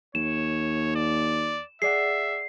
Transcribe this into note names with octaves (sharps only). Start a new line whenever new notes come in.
D#2 C#5 E7
D5
G#4 D5 E5 F#5 C7